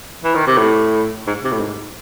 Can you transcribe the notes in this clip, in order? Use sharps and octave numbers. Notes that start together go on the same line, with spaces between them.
E3
D#3
C3
A2
G#2
C3
A2
G#2